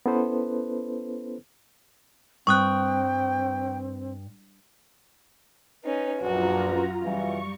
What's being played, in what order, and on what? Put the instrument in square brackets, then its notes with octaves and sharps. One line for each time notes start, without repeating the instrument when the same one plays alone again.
[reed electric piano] B3 C#4 E4 A4 B4 C5
[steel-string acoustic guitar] G2 [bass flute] C4 [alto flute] G5 [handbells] C#6 D#6 F#6
[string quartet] C#4 D#4 [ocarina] B4
[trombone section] A#1 [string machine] F#2 F4 A#5 [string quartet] F#4
[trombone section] E2 B2 E3 [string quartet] G3 [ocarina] F5 [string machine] C#6